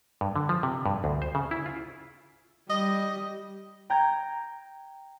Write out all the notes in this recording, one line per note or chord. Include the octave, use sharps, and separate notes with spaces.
G2
D3
F3
C3
G2
D2
C5
C#3
E4
F4
G3 D#5
G5 A#5 G6 G#6